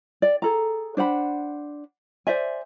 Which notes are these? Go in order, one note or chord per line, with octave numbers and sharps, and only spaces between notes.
D5
G#4 A4 A#5
D4 C5 F#5 B5
C5 D5 E5 G#5